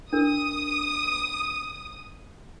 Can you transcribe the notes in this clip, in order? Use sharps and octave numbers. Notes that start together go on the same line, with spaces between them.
D4 A#4 D#6